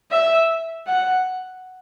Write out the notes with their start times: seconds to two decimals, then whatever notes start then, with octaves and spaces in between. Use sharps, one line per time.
0.11 E5
0.87 F#5